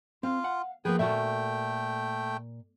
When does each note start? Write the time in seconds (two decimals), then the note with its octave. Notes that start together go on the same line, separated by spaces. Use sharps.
0.23 C4 F4 F5
0.44 F#5
0.85 F3 A#3 B3 G#4 B4 G5
0.99 A#2 A3 F#4 A4 E5 G5